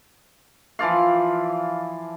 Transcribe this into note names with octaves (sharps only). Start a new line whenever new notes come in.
E3 F3 D5 F5